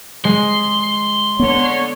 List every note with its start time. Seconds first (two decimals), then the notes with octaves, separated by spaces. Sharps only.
0.25 G#3 C6
1.39 D3 B3 C#5